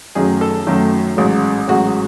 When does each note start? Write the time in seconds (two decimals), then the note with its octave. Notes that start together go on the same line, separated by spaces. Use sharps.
0.15 F#2 D#3 F#3 A3 G#4
0.41 A4
0.67 F#2 D#3 F#3 A3
1.17 A1 G#2 F#3
1.68 A1 G#2 F#3 F#4